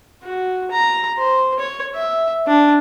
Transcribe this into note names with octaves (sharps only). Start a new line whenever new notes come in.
F#4
A#5
C5
C#5
E5
D4